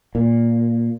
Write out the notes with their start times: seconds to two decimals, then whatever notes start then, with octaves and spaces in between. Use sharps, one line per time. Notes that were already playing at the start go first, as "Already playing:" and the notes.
0.15 A#2